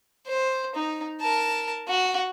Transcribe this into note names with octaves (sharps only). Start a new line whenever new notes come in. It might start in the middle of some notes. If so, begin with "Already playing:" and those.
C5
D#4
A#4 A5
F#4